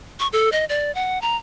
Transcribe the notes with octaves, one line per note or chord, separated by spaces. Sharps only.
C#6
A4
D#5
D5
F#5
A#5